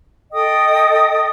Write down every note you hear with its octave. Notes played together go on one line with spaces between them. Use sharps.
A4 D#5 G5 D#6